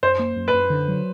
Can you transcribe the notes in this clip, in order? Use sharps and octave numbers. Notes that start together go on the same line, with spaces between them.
F#2 C5
A#3
F#2
B4
F#2
D3
F#3